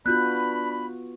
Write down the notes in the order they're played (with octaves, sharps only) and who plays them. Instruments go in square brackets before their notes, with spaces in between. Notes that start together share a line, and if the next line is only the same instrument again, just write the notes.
[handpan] B3 F4 F#4 [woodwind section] D4 B5 [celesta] F#6 G6